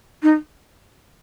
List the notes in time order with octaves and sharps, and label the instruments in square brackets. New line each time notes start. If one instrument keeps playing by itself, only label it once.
[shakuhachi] D#4